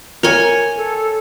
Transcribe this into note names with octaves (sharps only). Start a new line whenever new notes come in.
A#4 C#5 G#5
A4